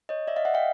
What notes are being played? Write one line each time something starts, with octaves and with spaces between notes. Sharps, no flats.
C#5 D#5
D5 E5
D#5 F5
E5 F#5
F5 G5